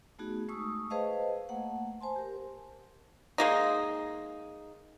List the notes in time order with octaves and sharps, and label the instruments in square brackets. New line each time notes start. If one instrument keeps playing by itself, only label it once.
[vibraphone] A3 B3 D#4 F#4 G#4
G#3 A3 C#6 D#6 E6
G#4 B4 C5 D#5 F5 A5
A3 A#3 F#5
C5 G#5 A5 C6
G4 A#4
[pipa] G#3 A#3 D#4